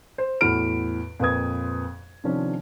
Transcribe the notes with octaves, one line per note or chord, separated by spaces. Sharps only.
C5
E2 A2 F#4 B5 F6 D7
F2 A#2 B4 D#6 G#6
C3 D#3 F3 C#4 D4